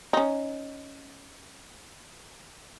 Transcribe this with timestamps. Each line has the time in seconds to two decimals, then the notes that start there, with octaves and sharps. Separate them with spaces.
0.13 C#4 D#4